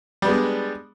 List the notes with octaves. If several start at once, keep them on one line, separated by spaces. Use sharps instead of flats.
G3 G#3 B3 D4